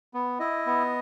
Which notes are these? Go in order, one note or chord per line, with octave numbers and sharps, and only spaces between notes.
B3
E4 D#5
B3